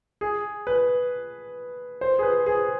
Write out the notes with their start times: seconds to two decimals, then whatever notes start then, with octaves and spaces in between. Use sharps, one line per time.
0.21 G#4
0.67 B4
2.01 C5
2.19 G#4
2.23 B4
2.46 G#4